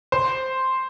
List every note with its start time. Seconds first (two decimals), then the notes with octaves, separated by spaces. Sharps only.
0.12 C5